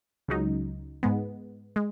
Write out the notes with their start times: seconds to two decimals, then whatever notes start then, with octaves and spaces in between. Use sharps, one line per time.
0.28 C#2 C#3 F#3 D#4
1.03 G#2 G#3 B3
1.76 G#3